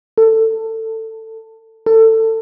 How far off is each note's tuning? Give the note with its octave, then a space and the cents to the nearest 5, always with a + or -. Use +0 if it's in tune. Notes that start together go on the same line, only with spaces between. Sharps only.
A4 +20
A4 +25